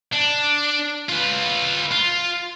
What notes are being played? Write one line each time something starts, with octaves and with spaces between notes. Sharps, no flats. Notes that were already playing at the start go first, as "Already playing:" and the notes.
D4
F4 B4
F4